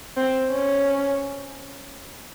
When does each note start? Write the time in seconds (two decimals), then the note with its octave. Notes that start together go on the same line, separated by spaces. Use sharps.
0.17 C4
0.52 C#4